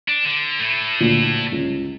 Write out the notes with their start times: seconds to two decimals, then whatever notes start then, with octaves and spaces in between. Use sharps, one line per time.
0.08 D4
0.25 D3
0.59 A2 A3
1.01 D2 A#2
1.52 C#2